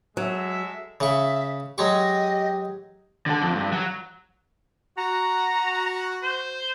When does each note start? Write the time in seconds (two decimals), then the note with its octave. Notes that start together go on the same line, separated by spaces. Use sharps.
0.17 F#3 G#3 A4 E5
1.00 C#3 E5 C#6
1.78 F#3 G#3 G4 D#5 C#6
3.26 D3 A4
3.42 F2
3.55 G2
3.72 F#3
4.98 F#4 A#5
6.23 C5